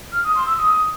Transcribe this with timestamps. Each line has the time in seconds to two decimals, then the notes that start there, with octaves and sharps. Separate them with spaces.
0.12 F6
0.24 D#6
0.35 C6
0.46 E6
0.58 D#6